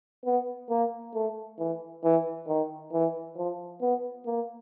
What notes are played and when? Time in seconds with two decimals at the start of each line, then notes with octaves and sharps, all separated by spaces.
0.25 B3
0.70 A#3
1.14 A3
1.59 E3
2.04 E3
2.48 D#3
2.93 E3
3.37 F3
3.81 B3
4.26 A#3